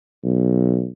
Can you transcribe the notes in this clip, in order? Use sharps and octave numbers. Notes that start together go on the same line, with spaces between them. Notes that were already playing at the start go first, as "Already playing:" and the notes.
B1